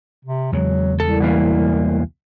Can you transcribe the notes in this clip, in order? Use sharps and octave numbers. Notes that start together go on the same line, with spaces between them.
C3
E2 C#3 F#3 G#3
C2 A4
B2 E3 A#3